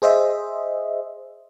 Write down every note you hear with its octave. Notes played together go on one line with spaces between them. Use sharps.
G#4 C5 D#5 E5